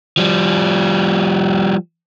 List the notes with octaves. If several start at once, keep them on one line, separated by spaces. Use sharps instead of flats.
F3 G3